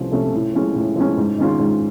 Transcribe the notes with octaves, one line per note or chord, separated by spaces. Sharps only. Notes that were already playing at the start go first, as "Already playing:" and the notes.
Already playing: C2 C3 F3 A3 C#4
C3 F3 A3 C#4
A2
F3 G#3 C#4
A2
F3 G#3 C#4
G#2
D#3 G#3 C#4 F4
G#2